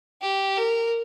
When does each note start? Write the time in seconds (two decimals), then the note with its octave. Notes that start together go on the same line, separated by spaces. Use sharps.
0.22 G4
0.57 A#4